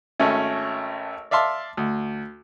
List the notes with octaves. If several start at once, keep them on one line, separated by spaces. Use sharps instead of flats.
G#1 A3 C#4
D5 E5 F5 A5 C6
D2